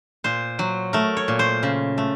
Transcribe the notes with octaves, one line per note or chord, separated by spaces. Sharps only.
A#2 C5
F#3
A3 A#4
C#5
A#2
C5
C#3
A3